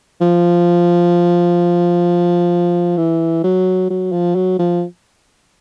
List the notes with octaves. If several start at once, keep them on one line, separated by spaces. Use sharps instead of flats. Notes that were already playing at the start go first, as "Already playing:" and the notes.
F3
E3
F#3
F#3
F3
F#3
F3